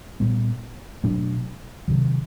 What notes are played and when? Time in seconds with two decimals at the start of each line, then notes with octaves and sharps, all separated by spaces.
0.20 A#2 G3 B3
1.04 B2 F#3 A3 D4
1.88 C3 D#3 F#3